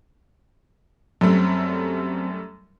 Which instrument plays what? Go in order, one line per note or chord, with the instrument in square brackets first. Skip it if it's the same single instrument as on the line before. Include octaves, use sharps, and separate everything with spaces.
[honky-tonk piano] F#2 G3 A3 [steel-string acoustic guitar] F#3 C4